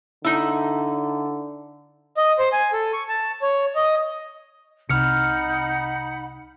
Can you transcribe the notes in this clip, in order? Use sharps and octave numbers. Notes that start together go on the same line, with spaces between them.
D3 D#4 E4
D#5
C5
G#5
A4
C#6
A5
C#5
D#5
C2 C3 D#4 F#5 B5 F6 C#7